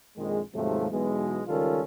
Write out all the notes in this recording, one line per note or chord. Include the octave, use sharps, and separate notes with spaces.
A#1 F2 D#3 G#3
D#2 G#2 C3 F3 F#3 A3
B1 B2 E3 G#3
C#2 D#3 G3 C#4 F4 A4